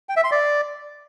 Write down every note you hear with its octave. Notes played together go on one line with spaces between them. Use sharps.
G5
E5
C6
D5